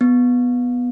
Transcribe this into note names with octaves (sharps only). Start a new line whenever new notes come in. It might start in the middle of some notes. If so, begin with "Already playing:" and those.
B3